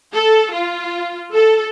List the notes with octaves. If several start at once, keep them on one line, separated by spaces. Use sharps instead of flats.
A4
F4
A4